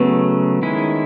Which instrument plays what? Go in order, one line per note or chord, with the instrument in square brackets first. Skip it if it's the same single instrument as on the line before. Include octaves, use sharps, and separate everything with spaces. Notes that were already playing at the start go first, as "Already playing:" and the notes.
Already playing: [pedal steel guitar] C#3 F#3 A3 [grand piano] B3
[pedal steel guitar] D#3 G#3 C#4 E4